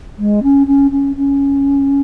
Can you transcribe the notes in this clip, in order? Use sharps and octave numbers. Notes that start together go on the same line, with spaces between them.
G#3
C#4
C#4
C#4
C#4